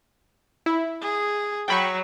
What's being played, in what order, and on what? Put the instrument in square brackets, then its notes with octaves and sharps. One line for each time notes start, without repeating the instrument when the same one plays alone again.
[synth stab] E4
[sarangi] G#4
[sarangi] F#3 [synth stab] G5 B5 C#6